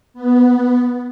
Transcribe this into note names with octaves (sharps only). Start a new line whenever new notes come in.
B3